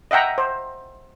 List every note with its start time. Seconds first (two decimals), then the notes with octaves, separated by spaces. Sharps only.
0.11 D#5 E5 F#5 G5 A#5
0.38 C5